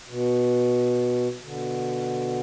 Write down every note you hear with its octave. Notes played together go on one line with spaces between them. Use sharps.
B2
B2 D3